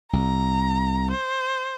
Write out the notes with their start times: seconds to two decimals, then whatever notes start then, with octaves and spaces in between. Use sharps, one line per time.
0.13 C2 A#5
1.11 C5